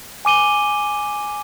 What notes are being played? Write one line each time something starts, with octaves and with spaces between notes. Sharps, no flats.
G#5 D6 D#7 G7